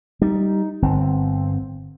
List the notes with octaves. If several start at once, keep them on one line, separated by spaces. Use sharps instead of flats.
G3 D#4
G1 C4